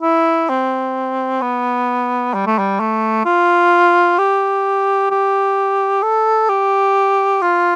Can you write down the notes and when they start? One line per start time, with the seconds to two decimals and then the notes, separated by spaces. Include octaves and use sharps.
0.02 E4
0.49 C4
1.41 B3
2.34 G3
2.46 A3
2.59 G3
2.80 A3
3.26 F4
4.18 G4
5.11 G4
6.03 A4
6.49 G4
7.41 F4